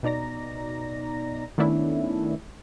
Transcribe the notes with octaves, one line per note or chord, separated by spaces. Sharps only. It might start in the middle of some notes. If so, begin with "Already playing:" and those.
B2 D#4 D5 A#5 A#6
D#3 A3 B3 C#4 D4 E4